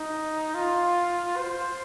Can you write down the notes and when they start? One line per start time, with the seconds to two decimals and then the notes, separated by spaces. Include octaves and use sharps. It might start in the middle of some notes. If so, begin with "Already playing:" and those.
Already playing: D#4
0.54 F4
1.36 C5